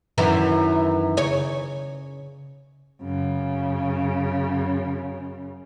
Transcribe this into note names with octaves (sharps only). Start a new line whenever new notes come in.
F#2 D#3 E3
C#3 C#5
F#2 C#3